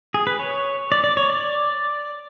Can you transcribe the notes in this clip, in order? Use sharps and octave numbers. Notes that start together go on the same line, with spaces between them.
G#4
B4
C#5
D5
D5
C#5
D5